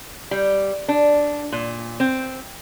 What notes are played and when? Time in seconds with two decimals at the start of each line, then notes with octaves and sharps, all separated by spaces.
0.31 G3
0.88 D4
1.52 A#2
2.00 C4